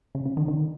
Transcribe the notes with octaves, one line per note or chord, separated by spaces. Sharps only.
C#3
C#3
D#3
D#3